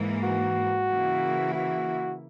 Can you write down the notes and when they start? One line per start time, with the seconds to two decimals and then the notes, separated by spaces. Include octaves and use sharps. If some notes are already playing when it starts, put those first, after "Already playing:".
Already playing: G#2 E3 A#3
0.24 F#4
0.89 C#3 E3 A#3 E4
1.54 F#4